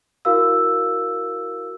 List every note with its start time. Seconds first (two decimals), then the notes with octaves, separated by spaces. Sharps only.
0.25 E4 F#4 A#4 F5 E6